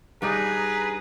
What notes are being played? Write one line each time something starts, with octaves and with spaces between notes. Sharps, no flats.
G2 D4 D#4 G#4 B4 A#5